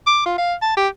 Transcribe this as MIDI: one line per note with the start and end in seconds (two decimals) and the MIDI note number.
0.07 0.21 86
0.26 0.36 65
0.38 0.54 77
0.62 0.72 81
0.77 0.88 67